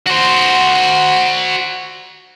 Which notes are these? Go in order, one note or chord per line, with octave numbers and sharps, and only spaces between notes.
F#4 C5